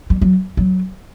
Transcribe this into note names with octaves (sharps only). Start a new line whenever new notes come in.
G3
F#3
F#3